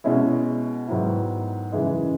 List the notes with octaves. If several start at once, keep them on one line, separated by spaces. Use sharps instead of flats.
B2 G#3 C#4 E4
G#2 D#3 F#3 B3 E4
F#2 C#3 E3 G#3 D#4